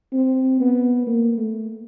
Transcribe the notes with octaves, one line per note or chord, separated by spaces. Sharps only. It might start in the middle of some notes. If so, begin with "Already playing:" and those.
C4
B3
A#3
A3